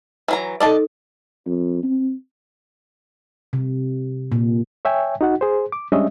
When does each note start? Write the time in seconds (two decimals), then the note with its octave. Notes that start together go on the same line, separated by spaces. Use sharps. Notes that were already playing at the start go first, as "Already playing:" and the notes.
0.28 E3 F#3 A#5
0.60 D#4 A4 D5 D#5 A5
1.46 F2
1.83 C4
3.53 C3
4.32 A#2
4.85 C#5 E5 G5 G#5
5.21 D#4 F#4 F#5
5.41 G#4 C5
5.72 D6
5.92 G3 G#3 C#4 D4 D#5 E5